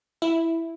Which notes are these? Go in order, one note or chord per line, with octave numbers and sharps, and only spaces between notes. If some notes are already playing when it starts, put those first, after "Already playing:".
E4